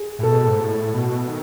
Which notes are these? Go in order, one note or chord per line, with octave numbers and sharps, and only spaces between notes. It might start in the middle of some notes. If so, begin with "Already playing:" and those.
Already playing: G#4
A2
B2 A4
G#2
A2
B2
D#3